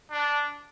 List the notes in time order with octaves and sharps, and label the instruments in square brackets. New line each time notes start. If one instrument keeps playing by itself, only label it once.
[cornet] D4